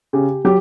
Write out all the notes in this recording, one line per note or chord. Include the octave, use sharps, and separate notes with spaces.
C#3 G4
F#3 G4